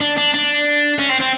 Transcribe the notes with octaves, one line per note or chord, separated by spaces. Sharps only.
D4
D4
D4
C#4
C4
C4